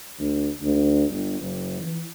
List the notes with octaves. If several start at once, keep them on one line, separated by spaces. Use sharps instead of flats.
D2
D2
G1
F#1
E3